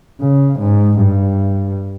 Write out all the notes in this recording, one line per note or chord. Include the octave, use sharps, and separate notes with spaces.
C#3
G#2
G2